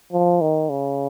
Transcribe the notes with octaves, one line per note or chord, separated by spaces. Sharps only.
F3
D#3
C#3